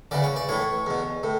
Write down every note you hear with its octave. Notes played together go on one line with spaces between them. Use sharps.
E2 C#3 E3 D5
C#5
D5
A2 E3 C#5
E2 B2
A2